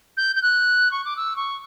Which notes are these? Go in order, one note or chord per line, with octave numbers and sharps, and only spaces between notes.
G6
G6
F#6
C#6
D6
E6
C#6